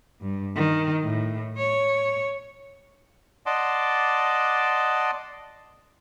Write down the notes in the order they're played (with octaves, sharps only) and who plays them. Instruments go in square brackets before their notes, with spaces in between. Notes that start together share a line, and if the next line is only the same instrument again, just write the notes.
[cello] G2
D#3
A2
C#5
[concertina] D5 D#5 F#5 A5 C6 D6